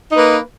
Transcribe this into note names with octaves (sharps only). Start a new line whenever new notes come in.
A#3 D#4 B4